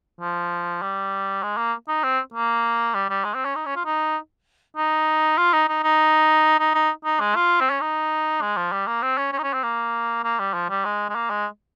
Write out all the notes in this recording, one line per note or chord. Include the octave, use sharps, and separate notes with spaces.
F3
G3
G#3
A#3
D#4
C4
A#3
G3
G3
G#3
C4
C#4
D#4
C#4
F4
D#4
D#4
F4
D#4
D#4
D#4
D#4
D#4
D#4
G#3
F4
C4
C#4
D#4
G#3
F3
G3
A#3
C4
C#4
C#4
D#4
C#4
C4
A#3
A#3
G3
F3
G3
G#3
G#3
A#3
G#3